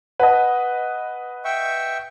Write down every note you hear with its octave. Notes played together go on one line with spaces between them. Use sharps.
B4 D#5 F#5 A5
E5 G5 C#6